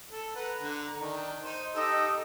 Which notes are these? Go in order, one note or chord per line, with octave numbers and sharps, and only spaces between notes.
A4
B4 F#5 A#5
D3
D#3 D4
D#4 C5
D#4 G4 A4 E6